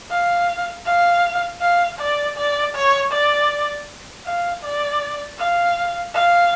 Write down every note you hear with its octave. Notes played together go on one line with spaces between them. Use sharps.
F5
F5
F5
D5
D5
C#5
D5
F5
D5
F5
F5